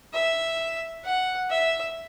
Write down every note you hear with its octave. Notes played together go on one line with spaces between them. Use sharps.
E5
F#5
E5